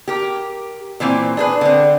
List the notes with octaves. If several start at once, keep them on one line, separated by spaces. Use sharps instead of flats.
G4 A#4
A#2 E3 A#3 C4
D4 G#4 B4
D3 C4